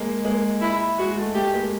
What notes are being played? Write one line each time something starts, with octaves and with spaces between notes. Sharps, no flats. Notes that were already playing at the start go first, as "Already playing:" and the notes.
Already playing: G#3 A#3
G#3 A#3
E4
G#3 F#4
A3
A3 G4
G#3 A#3